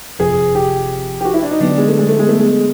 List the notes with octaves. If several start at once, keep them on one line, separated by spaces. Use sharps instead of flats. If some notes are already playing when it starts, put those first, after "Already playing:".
G1 F2 C3 F3 G#4
G4
G4
F#4
E4
D4
D#4
D3 F#3 B3 D4
G#3
A3
G#3
A3
G#3
A3
G#3